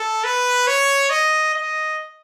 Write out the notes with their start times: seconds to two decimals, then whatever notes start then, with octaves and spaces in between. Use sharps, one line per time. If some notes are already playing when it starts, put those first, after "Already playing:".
Already playing: A4
0.24 B4
0.67 C#5
1.10 D#5
1.54 D#5